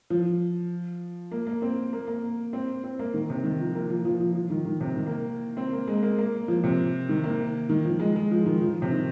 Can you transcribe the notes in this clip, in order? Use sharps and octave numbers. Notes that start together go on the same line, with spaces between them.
F3
A#3
A#3
C4
A#3
A#3
C4
C4
A#3
D#3
C3
D#3
F3
A#3
F3
F3
F3
F3
D#3
D#3
C3
D#3
A#3
C4
A#3
G#3
A#3
A#3
F3
C3
D#3
A#3
D#3
F3
G#3
G#3
F3
D#3
F3
C3
D#3